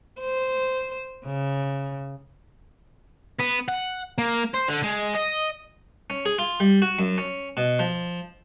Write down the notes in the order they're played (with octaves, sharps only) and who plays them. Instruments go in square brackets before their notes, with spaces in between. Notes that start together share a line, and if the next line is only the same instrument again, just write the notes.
[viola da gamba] C5
C#3
[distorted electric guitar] B3
F#5
A#3
C5
D3
G#3
D#5
[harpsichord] C#4
G#4
F4
G3
F#4
F#2
C#4
B2
F3